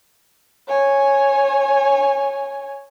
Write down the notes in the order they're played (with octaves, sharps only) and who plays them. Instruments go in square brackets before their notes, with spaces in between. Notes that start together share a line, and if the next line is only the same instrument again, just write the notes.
[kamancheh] C#5 G#5